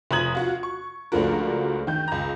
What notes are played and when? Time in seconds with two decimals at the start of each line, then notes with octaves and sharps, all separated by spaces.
0.11 F1 F3 A#5 D#6 G#6 F#7
0.35 F4 F#4
0.63 C#6
1.12 C#2 F3 A3 D4 F#4 A#4
1.87 D#3 G6
2.08 C#2 A#5